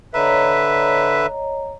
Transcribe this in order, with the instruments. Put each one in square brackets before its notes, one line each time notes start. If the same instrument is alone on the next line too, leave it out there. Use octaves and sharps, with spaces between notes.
[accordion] D3 B4 E5 [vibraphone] C#5 D#5 A#5